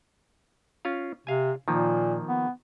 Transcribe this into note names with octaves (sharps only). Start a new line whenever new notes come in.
C#4 F4 F5
C3 F5 G#5
A#2 D#3 F3 A#3
B3